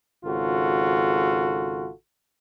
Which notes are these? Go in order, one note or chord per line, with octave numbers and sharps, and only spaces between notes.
G#1 C#3 F4 F#4 A4